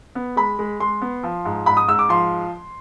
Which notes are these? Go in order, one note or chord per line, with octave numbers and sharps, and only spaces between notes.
B3
G#3 B5
G#3
G#3 C6
B3
F3
G#2
G#2 B5
D#6
G#2 E6
D6
F3 C6